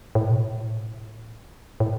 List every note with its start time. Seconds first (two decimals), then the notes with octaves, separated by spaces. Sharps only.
0.15 A2
0.29 B2
0.42 A2
1.80 A2